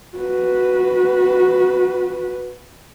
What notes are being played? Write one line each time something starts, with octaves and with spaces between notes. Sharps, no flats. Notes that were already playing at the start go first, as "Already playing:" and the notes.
F#4 B4